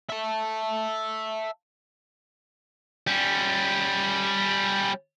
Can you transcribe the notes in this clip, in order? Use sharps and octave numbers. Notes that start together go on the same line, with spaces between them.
E5 A5
G3 C#4